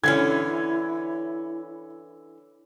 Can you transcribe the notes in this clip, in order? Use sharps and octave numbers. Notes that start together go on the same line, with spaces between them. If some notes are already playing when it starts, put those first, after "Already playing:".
D3 E3 C#4 E4 G#6